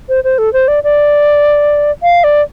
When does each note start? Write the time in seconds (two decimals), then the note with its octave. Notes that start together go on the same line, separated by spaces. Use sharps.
0.09 C5
0.24 C5
0.38 A4
0.53 C5
0.68 D5
0.84 D5
2.03 F5
2.24 D5